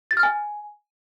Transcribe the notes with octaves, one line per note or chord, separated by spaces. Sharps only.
A6
F6
G#5